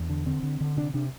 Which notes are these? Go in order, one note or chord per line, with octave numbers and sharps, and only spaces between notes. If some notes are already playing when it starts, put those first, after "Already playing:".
Already playing: E2 D4
D3
D3 C4
D3
D3
C3 D4
C3 D4